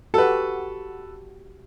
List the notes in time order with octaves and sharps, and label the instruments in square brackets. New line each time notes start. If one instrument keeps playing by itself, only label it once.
[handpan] F#4 G4 [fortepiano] A4 B4